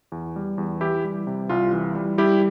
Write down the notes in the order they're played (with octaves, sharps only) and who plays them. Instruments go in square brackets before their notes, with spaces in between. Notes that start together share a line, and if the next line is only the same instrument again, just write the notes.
[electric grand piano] E2
G3
E2
E3 E4 G4
G3
C3
C2 F4
E3
G3
G3 E4 G4